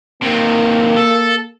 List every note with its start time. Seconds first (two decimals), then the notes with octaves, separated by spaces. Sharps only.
0.22 C3 D#3 A#3
0.97 A4